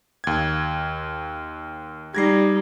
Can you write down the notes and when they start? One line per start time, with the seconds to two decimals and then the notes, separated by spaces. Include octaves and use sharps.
0.24 D#2 G#6
2.15 G3 D#4 G#6 A#6 C7